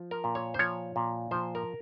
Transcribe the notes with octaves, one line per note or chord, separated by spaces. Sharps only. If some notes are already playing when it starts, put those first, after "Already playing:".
Already playing: F3
A#4
A#2
C#5
C5
F3 C#5
A#2
F3 C5
A#4